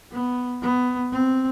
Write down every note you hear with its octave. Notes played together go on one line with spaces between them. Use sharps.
B3
B3
C4